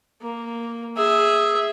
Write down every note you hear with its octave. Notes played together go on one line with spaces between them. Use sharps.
A#3
G#4 E5